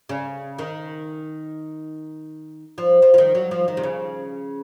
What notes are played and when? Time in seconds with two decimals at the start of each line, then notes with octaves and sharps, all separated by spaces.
0.09 C#3
0.59 D#3
2.78 F3
3.02 F3
3.14 F3
3.18 D#3
3.35 F#3
3.51 F3
3.68 D#3
3.77 C3
3.84 C#3